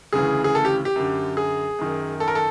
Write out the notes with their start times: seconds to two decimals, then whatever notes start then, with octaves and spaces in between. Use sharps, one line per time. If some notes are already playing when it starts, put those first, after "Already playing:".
0.13 D2 C#3 E3 G#4
0.44 G#4
0.55 A4
0.65 G4
0.85 G4
0.96 F#2 D3
1.37 G#4
1.79 F#2 D#3
2.20 A4
2.28 A#4
2.35 A4